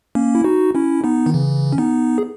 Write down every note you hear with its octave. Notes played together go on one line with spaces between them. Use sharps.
A#3 C#4
E4
D#4 F#4
C#4 E4
B3 D#4
D#3
C#3 E3
C#4
B3 D#4
G#4